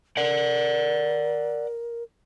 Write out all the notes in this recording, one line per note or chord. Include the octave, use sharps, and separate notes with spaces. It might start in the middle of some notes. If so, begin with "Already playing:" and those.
A#4 D5 F#5